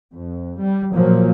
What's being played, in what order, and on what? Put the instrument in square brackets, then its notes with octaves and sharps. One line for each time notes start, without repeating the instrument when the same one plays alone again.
[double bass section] F2
G3
A#2 F3 F#3 A#3